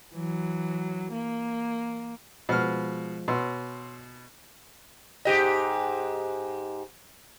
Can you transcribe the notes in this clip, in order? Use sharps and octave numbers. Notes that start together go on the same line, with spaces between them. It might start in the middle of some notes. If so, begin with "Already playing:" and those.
E3 F#3
A#3
B2 F3 G#3 C5 F6
B2 C#5 C6 E6
G#2 G4 D#5